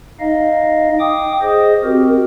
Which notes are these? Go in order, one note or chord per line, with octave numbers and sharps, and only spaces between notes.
D#4 D#5 F5
G5 D6 D#6
G#4 C5 D#5
C4 F#4 G4 A#4